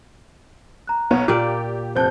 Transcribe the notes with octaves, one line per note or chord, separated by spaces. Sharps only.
A#5 F#6
B1 B3 C#5
A#2 A#3 G4 D5
F1 C5 A5 F#6 G6